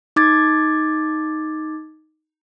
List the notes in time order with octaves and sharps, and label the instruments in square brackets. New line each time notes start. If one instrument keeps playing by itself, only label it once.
[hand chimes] D#4 D6 G#6 A6